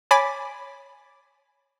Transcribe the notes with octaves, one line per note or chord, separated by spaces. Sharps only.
C#5 G#5 B5 D6 A6 B6